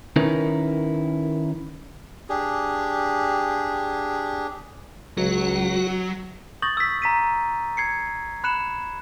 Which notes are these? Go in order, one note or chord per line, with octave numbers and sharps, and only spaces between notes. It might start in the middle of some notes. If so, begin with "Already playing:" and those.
D#3 C#4 D#4 E4 A#4 B4
D4 G4 G#4
C#2 F#3 F#4
C#6 D#6 G6 A6 A#6 F#7
E6 B6
A#5 B6 D#7
G#6 C7 C#7
B5 F#6 C#7 E7 F#7